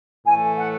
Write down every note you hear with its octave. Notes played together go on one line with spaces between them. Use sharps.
A2 E3 A3 G#5
F#5